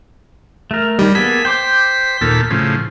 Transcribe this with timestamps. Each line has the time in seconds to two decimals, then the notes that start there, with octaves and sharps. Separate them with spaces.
0.71 A3 A#4
0.99 D#3 G3 D#4
1.15 A#3 B3 G#4 A4 B6
1.45 C5 G5 C6 D6
2.21 D#2 A#2 A4
2.50 A2 C#3 F3